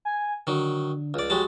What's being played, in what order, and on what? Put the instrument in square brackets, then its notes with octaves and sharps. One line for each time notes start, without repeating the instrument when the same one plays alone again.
[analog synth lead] G#5
[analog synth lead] D3 [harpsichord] D#3 F#3
[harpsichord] C#2 D5
[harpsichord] F#3 G#3 A5 [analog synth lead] G4